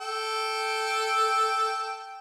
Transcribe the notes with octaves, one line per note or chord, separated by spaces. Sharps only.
A4 G5